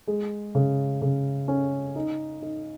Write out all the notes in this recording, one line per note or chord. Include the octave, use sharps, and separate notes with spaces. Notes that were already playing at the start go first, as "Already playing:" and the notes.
G#3
C#3
C#3
C#4
D#4
D#4